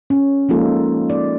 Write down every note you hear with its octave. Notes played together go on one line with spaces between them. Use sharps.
C#4
F3 G#3 A#3 D#4 F4 A4
D#4 D5